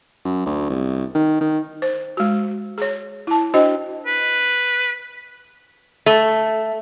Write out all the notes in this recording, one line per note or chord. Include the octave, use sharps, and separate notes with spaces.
F#2
D2
C2
D#3
D#3
C5
G#3 F#4
G#4 C#5
E4 A5
D4 F#4 C5 D#5 G5
B4
A3